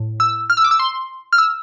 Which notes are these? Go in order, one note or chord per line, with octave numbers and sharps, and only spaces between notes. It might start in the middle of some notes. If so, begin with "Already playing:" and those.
Already playing: A2
E6
F6
E6
D6
E6
C6
F6
E6